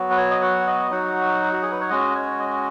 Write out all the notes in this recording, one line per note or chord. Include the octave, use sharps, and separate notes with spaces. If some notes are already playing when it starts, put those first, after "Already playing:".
Already playing: F#3 B3 F#4
B4
C#5
D#5
F#5
D#5
F#3 D#4 F#4 F#5
F#4
G#4
B4
C#5
G#3 C#4 F#4 D#5
C#5
D#5